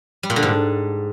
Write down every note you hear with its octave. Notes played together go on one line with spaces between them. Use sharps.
G3
A#2
D3
G#2